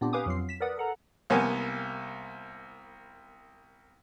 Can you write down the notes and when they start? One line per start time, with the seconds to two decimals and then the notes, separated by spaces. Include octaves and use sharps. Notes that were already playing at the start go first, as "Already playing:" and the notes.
0.01 A#2 B3 C4 D4 G4
0.13 G4 B4 F5 G#5 D6 D#6
0.26 F2 F#3 F4 C7
0.49 B6 E7
0.60 A#4 B4 D5 F#5 D#6
0.77 A4 A#4 F#5 A#5
1.30 C2 A#3 B3 G#5